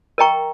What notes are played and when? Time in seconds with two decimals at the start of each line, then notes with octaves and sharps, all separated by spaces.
0.18 A#4 D#5 G5 A#5 C#6